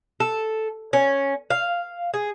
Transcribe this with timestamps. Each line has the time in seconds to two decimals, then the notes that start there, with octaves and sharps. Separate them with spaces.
0.20 A4
0.93 C#4
1.50 F5
2.14 G#4